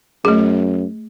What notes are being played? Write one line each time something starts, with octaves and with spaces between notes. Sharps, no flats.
F#2 A3 G#4